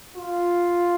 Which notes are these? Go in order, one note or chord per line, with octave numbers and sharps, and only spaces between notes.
F4